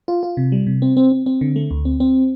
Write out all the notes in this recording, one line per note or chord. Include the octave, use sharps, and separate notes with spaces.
F4
F4
C3
G3
C3
C4
C4
C4
C4
D3
A3
D2
C4
C4